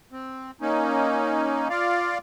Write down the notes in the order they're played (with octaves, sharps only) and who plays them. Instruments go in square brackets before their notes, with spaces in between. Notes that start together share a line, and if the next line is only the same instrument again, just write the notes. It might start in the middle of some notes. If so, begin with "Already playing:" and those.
[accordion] C4
A#3 C#4 D#4
F4 D5 F5